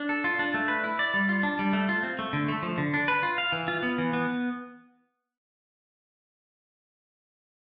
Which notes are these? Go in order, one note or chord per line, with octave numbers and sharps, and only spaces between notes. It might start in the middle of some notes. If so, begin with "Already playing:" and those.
Already playing: D4
A4
F4
D4
A3
B4
E4
D5
G3
F4
D4
G3
A3
F4
C4
A3
D3
A3
F3
D3
D4
B4
F4
F5
E3
F4
B3
E3
B3